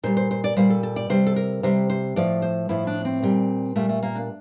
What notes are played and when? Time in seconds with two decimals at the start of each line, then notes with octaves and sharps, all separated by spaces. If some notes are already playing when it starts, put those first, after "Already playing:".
0.03 A#2 G3 C5
0.17 C5
0.31 C5
0.44 D5
0.57 A#2 G3 C5
0.70 A4
0.83 A4
0.96 D5
1.10 C3 G3 C5
1.27 A4
1.36 A#4
1.63 C3 G3 C5
1.90 C5
2.16 A2 F3 D5
2.42 C5
2.69 A2 F3 E4
2.87 D4
3.05 C4
3.23 A#2 G3
3.76 A#2 G3 A3
3.89 A3
4.03 A#3
4.15 D4